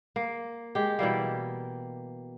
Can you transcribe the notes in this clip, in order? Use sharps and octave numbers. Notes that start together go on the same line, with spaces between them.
A#3
G#3 G4
B2 E3 G3 A#3